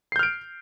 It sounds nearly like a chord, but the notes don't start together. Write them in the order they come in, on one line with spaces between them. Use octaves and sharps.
C7 G6 F6 D7